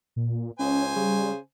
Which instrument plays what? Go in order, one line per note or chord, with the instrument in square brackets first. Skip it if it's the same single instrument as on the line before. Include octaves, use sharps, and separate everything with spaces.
[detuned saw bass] A#2
[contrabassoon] C#2 [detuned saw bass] C#4 [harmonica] C5 G#5
[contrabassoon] C#3 [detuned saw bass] G3